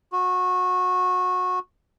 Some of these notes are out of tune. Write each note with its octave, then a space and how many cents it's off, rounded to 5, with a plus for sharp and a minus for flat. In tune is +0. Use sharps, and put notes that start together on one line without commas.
F#4 -20